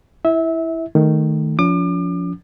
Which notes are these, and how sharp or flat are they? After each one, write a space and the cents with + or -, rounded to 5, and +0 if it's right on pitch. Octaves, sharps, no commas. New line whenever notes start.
E4 +0 E5 -25
D#3 +0 A3 +0
F3 +5 C#4 +45 D6 +40